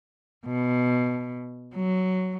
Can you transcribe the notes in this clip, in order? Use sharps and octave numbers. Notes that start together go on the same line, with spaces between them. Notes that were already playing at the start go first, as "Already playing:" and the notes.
B2
F#3